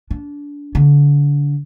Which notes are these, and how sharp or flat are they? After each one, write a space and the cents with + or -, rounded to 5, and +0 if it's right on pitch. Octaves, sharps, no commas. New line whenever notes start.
D4 -25
D3 -30